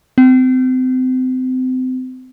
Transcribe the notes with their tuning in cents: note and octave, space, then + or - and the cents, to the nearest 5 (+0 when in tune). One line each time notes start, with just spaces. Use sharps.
C4 -30